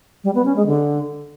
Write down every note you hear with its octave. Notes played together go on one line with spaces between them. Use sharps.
G3
B3
C#4
G#3
D3